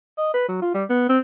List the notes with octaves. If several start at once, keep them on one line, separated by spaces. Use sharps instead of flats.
D#5
B4
F#3
F4
G3
B3
C4